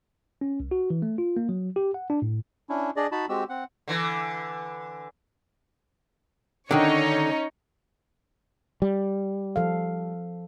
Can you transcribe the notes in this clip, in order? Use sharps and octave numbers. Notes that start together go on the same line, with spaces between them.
C#4
C2
F#4
E3
A3
F4
A#3
F#3
G4
F#5
D4
A2
C#4 D4 E4
D4 G#4 D5 D#5
D#4 F#4 A5 B5
G#3 C4 F#4 G4 E6
C4 F#5
D3 E3
D3 D#3 C#4 D#4 C#5
G3
F3 A4 F5